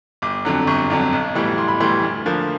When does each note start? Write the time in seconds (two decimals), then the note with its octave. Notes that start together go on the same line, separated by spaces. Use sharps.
0.22 G1 D6
0.45 F2 D3 F#3
0.67 G1 C#6
0.90 F2 D3 F#3
1.13 B1
1.35 A2 E3 G3
1.57 B1 C6
1.68 B5
1.80 A2 E3 G3 C6
2.03 D2
2.26 D3 F3 A#3